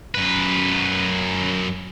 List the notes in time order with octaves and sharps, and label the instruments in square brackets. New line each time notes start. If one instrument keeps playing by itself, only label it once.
[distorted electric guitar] F#2 B4